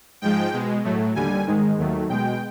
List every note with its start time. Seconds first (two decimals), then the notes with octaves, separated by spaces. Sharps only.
0.22 G#2 F3 G#3 G5
0.53 B2 G#3
0.84 A2 F#3 A3
1.16 D#2 D3 G3 G#5
1.47 G#2 D#3 G#3
1.78 D#2 D#3 F#3 A3
2.09 B2 G#3 G5